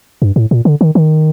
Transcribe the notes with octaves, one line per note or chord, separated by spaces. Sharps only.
G2
A2
A#2
D3
D#3
D#3